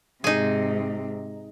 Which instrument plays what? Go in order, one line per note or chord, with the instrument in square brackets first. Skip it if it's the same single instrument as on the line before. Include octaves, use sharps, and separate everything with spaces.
[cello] G#2 C3 [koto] D#4 G#4